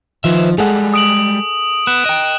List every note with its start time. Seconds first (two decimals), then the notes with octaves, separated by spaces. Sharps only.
0.24 D#3 F3 B4 C5 E5
0.58 G3 G#3 G#4 A4 F#5
0.94 D#6 D7 F#7
1.87 B3 F#6 E7
2.06 D#5 G5